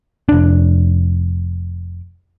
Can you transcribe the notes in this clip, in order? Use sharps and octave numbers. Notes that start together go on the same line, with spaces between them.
F1 D4